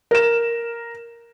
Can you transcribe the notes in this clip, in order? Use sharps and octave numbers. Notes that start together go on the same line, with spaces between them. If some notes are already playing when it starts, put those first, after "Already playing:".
A#4 E7